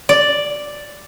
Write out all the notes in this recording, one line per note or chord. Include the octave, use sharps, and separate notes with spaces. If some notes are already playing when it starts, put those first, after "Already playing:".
D5